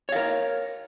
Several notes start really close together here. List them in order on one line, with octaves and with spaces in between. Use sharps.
C#5 F5 A#4